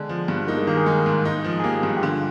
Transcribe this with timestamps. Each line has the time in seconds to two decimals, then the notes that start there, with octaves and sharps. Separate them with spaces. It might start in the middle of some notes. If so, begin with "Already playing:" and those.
Already playing: D3 G#3 D4
0.09 F3
0.28 G2
0.47 A#3 D#4
0.57 G#3
0.67 D#3 A#3
0.77 G#4
0.86 G#3
1.06 G#2
1.25 D#4
1.44 F3
1.60 G#4
1.64 A#3 G4
1.83 G2
1.97 G4
2.03 D3 F4